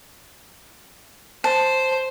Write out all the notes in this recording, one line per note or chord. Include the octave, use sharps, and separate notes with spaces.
C5 A5